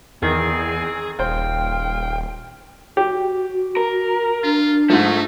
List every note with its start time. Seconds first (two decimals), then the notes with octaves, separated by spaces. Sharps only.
0.23 E2 D#3 C4 G#4
1.19 D#1 C5 F5 G5
2.97 F#4 G4
3.77 A#4
4.44 D4 F4
4.90 G#2 F3 A3 D#4